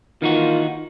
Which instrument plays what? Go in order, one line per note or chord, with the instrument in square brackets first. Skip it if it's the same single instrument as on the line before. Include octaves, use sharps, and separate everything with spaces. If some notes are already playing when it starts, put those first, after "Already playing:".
[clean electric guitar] D#3 D#4 F#4 [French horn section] E3 A#3 F4